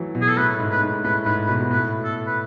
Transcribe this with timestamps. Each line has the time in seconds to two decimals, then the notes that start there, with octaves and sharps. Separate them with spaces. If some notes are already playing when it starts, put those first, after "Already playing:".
Already playing: E3 F#3 A3
0.15 B2
0.21 G#4
0.28 A4
0.37 A2 B4
0.59 G#2
0.71 B4
0.82 G#2
1.04 A2 B4
1.25 G#2 B4
1.46 B2 B4
1.61 B2
1.71 A2 B4
2.04 A4
2.27 B4